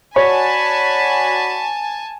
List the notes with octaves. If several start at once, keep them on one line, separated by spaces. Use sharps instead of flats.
F#4 C#5 D5 G#5 A5 B5